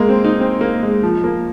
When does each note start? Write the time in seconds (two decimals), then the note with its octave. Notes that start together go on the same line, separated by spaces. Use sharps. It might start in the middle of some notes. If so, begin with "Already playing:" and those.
Already playing: G#3 A#3
0.09 C4
0.25 D#4
0.40 C4
0.61 A#3
0.83 G#3
1.03 F3
1.24 A#3